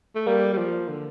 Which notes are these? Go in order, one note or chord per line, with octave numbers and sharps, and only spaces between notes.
A3
G3 A#3
G3
F3
D3